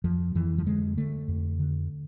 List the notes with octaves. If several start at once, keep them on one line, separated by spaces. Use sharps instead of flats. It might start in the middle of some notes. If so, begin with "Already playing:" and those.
F2 F3
F2 E3
F3
D3 G#3
D3 A3
F2
D3